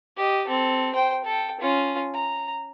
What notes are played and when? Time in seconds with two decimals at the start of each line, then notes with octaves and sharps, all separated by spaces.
0.17 G4 D#5
0.47 C4 A4
0.93 C5 G5
1.24 A4 G5
1.61 C#4 F4
2.14 A#5